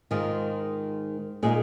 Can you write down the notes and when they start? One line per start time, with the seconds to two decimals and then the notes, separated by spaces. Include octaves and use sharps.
0.11 G#2 D#3 G#3 D#4 F4
1.43 A#2 G#3 D#4 G#4